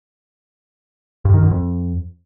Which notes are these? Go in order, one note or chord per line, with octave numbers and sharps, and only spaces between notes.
G2
D#3
F#2
F2